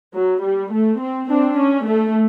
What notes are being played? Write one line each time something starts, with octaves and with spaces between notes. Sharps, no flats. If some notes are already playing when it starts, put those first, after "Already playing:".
F#3
G3
A3
C4
C4 D4
C#4
A3